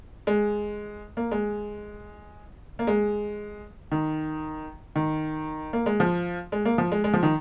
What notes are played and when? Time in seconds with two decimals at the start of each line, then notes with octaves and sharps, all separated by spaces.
0.27 G#3
1.17 A#3
1.31 G#3
2.79 A#3
2.87 G#3
3.91 D#3
4.96 D#3
5.73 A#3
5.86 G#3
6.00 F3
6.52 G#3
6.65 A#3
6.78 F3
6.92 G#3
7.04 G#3
7.13 F3
7.23 D#3